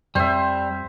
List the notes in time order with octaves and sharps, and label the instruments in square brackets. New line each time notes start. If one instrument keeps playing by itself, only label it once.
[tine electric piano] F2 [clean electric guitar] G3 [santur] C5 E5